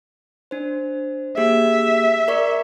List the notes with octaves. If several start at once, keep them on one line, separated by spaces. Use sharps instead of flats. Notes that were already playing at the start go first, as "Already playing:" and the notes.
D4 C5
A#3 G4 G#4 E5
A#4 D5 C#6